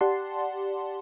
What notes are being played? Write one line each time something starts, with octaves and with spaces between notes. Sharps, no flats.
G4 D5 F#5 A5 C6